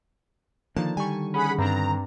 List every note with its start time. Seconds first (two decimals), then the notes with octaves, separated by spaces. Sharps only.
0.76 D3 D#3 F3 A#3 A5
0.97 G3 G#5 C#6
1.34 C#4 G#4 F#5 B5
1.58 G2 C4 D4 A#5